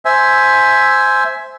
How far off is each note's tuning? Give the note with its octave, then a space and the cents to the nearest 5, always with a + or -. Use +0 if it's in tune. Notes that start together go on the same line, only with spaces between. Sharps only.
C5 +0 E5 +0 G#5 +10